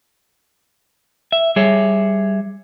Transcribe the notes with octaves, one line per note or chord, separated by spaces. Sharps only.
E5
G3 G#4 C#5 E5